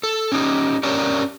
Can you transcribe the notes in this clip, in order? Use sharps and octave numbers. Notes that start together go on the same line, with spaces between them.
A4
C#4 D#4 G4
C#4 D4 G4 A#4 C#5 D5